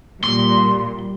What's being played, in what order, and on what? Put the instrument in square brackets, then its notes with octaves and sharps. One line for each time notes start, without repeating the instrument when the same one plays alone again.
[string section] A#2 [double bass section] G3 [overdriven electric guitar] C6